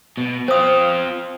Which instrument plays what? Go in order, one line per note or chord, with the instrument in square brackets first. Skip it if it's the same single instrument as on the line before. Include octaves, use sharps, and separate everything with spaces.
[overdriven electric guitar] B2
[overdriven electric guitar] C4 F4 [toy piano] C5 D#6